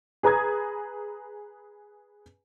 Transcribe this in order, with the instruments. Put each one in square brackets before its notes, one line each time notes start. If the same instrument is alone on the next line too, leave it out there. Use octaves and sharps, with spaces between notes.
[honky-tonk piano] G#4 B4 A#5 D#6 G#6